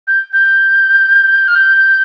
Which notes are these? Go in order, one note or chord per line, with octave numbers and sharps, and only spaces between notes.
G6
G6
F6
G6